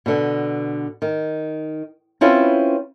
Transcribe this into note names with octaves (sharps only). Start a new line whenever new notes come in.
B2 D3
D#3
C4 C#4 E4 F4 B4